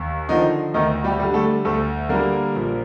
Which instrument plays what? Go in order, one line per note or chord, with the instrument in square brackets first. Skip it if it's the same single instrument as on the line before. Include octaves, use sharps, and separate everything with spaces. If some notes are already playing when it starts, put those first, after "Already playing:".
Already playing: [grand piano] D#2
D3 D#3 F3 D#4
D2 D#3 D#4
G3 G4
D3 G3
A3 A4
D2 A3 A4
D3 G3 A#3 A#4
A#1